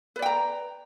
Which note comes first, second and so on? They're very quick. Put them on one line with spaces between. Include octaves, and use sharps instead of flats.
B4 D5 G5 A#5